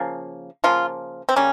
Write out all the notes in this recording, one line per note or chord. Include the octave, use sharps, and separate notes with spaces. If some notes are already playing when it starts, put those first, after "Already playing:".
Already playing: C#3 F3 A#3
C#3 F3 A#3 F4
C4
C#3 G3 A#3 C#4